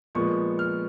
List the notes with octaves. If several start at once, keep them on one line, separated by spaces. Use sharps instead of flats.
A#2 F3 G#3 B3 C#6
F6